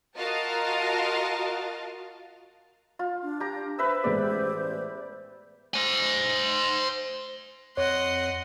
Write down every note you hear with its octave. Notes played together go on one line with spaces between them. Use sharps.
F4 F#4 A#4 D#5 F5 A5
F4
D4
G4 A#5
B4 C5 E5 E6
A1 G#3 B3 D5
C5 G#5
F2 C#5 D#5 F#5 C6